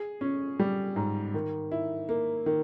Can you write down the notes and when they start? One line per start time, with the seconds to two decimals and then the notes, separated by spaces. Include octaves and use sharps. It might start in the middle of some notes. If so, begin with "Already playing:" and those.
Already playing: G#4
0.21 C#4
0.59 G3
0.96 G#2
1.34 D#3
1.71 E4
2.09 A#3
2.46 D#3